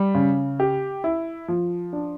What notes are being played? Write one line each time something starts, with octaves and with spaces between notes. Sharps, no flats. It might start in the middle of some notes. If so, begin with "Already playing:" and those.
Already playing: G3
C#3
G4
E4
F3
D4